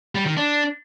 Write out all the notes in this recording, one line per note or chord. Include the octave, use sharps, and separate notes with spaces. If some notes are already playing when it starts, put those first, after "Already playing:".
G3
D#3
D4